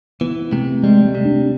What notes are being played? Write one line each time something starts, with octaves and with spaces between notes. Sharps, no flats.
E3 B3
C3 A3
G3 G#3
A3
C3
D4